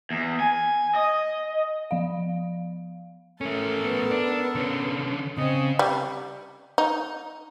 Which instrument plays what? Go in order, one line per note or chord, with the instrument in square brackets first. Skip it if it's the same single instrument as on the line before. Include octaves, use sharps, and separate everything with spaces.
[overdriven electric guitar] E2
G#5
D#5
[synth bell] F3 F5
[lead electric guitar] A3 C#4 [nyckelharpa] A4 A#4
[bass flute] B3
[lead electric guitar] D4
D3 C#4
[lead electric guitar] C#3 [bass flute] C4 [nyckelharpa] D#5
[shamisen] G3
D#4